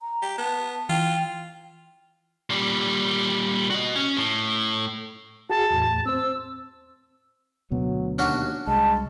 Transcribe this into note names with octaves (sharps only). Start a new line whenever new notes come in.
A#5
G4
B3 A5
E3 F4 G5
A#2 G3
F#4 D#5
C#4
A2
F#4 G#4 A5
E2 A2
C4 C5 E6
D2 B2 F#3 B3
D#2 C#4 D4 F#4
C2 G#3 A5